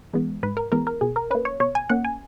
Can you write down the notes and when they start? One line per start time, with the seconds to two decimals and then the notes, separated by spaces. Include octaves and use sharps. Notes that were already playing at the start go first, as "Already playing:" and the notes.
0.13 E3 G#3 B3
0.43 G#2 B4
0.57 A#4
0.72 E3 G#3 B3 A#4
0.87 A#4
1.01 B2 G#4
1.16 A#4
1.31 A#3 C#4 B4
1.45 C#5
1.60 B2 C#5
1.75 G#5
1.89 A#3 C#4 F#5
2.05 G#5